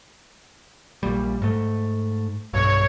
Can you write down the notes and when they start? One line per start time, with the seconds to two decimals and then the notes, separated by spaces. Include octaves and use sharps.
1.03 A#1 A#2 G3
1.42 G#2 A3
2.53 B1 G2 C#5